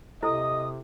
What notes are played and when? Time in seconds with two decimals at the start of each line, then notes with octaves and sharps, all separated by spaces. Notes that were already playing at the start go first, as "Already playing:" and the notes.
0.23 C3 E4 G4 A4 D#5 D#6